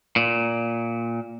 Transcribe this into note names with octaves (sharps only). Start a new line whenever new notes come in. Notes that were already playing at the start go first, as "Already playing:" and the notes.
A#2